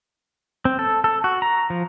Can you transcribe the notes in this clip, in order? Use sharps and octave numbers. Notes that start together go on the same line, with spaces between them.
C4
A4
A4
F#4
A#5
F3